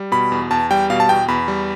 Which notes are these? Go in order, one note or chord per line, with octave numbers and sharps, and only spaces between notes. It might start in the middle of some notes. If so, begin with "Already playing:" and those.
Already playing: G3
B2 B5
E2
E2 A5
G3 G5
B2 F5
A5
E2 G5
E2 B5
G3